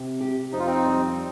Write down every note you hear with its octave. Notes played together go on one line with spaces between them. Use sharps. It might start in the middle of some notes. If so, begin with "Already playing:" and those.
Already playing: C3
G4
F2 D#4
F4
C4 D#4
G3